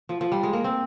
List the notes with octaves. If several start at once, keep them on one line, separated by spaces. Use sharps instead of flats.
F3
F3
G3
G#3
A#3
C4